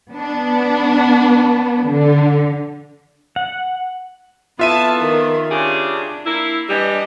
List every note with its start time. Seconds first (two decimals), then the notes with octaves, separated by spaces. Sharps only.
0.13 B3 D4
1.87 D3
3.36 F#5
4.59 F2 B3 E4 F4 E5 A5 D#7
5.00 D#3 A#4
5.51 C#3 D4 G4 G#4
6.26 A#3 E4
6.69 E3 G3 D4 D#5